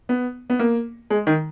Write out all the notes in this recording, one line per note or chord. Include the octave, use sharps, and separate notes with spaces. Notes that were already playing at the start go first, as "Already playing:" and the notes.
B3
B3
A#3
G#3
D#3